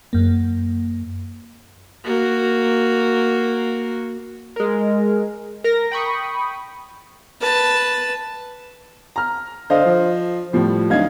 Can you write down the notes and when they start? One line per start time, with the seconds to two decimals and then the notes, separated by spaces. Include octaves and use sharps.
0.13 F#2 A#3
2.04 A#3 F#4
4.56 G#3 A#4
5.64 A#4 A#6
5.91 G5 B5 C#6 D#6
7.41 B4 A5
9.16 A#5 F6
9.70 D3 C5 D#5 F5
9.85 F3
10.53 A2 F3 G3
10.90 D1 D#4 F5 G#6